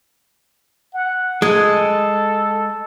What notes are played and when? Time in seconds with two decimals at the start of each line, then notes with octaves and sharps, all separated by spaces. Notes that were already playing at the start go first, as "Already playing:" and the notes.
0.94 F#5
1.42 G#3 A4